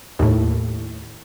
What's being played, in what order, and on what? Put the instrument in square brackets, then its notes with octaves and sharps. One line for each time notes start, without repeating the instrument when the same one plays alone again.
[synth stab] D#2 A2